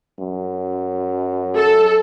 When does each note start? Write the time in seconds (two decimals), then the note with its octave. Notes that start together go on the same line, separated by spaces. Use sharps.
0.19 F#2
1.56 A4